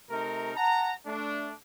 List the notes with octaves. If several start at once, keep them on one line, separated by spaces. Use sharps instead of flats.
C3 A3 D#4 A#4
F#5 A5 A#5
A3 D4